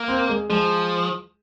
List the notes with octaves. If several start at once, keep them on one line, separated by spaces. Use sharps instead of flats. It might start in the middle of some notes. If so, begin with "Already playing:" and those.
Already playing: A#3
C4
G#3
F3 G#3